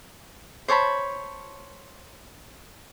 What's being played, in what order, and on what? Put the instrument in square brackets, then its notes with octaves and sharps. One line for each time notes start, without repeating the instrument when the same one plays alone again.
[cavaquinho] C5 C#5 A5 B5